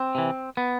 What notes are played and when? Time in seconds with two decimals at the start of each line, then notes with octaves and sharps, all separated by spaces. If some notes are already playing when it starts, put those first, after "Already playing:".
Already playing: C4
0.15 C3 E3
0.57 B3